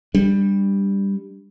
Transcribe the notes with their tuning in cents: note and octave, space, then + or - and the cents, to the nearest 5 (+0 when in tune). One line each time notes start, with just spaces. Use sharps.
G3 +10 D4 +0